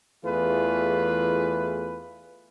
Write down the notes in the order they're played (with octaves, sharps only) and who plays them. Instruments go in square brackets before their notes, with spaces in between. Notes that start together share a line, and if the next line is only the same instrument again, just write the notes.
[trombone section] E2 E3 A3 F4 G#4 B4